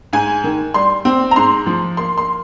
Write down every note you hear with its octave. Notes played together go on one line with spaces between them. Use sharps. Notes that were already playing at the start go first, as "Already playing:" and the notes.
G#2 G#5
D#3
G3 C6
C4
A#5
G#2 C6
F3
A#3 C6
C6